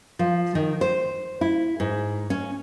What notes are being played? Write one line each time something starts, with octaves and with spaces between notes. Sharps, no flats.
F3
D#3
C5
E4
G#2
C#4